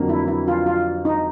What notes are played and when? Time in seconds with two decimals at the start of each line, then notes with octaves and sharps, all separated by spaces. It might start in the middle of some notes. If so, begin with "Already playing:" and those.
Already playing: F2 D3 F#3 A#3
0.09 E4
0.28 E4
0.48 F4
0.66 F4
1.05 D#4